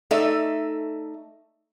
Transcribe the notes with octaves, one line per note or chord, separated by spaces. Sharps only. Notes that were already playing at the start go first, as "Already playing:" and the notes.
A3 D#4 A4 D5 E5